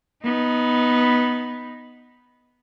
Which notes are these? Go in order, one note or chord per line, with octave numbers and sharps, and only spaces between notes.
B3 D#4